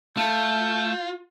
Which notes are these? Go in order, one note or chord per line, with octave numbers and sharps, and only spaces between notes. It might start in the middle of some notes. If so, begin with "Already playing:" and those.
A3 F4 A5 G6